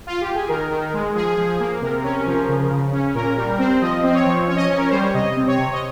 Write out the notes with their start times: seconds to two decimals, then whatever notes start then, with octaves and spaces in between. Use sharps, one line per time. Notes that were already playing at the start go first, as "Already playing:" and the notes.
0.07 F4
0.21 G4
0.35 G#4
0.49 D#3 A#4
0.71 D#3
0.93 G#3
1.15 F3 G#4
1.38 F3
1.60 A#3
1.82 C3 A#4
2.04 C#4
2.26 F3
2.48 C#3
2.71 C#3
2.93 C#4
3.15 A#2 A#4
3.37 G3
3.59 C4
3.81 F3 D#5
4.03 C4
4.10 D#5
4.14 C#5
4.26 F3
4.47 C#4 C#5
4.56 D#5
4.64 C#5
4.70 C#4
4.77 A#4
4.90 G3 C5
5.02 C#5
5.14 C3 D#5
5.37 C4
5.47 C#5
5.58 C3
5.73 D#5